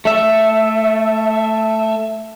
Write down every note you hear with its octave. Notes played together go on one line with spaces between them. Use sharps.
A3 E5